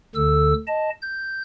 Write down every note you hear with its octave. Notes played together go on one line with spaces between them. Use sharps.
D2 D3 A4 E6
D#5 A5
G6